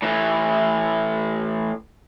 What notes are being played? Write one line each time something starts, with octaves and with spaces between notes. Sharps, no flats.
A2 E3